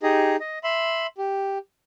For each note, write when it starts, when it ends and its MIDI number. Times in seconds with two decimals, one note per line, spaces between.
0.03 0.36 63
0.03 0.36 67
0.03 0.36 68
0.03 0.36 75
0.40 0.59 75
0.64 1.07 76
0.64 1.07 83
0.64 1.07 84
1.18 1.58 67